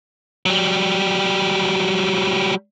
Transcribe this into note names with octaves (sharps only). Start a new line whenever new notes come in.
F#3 G3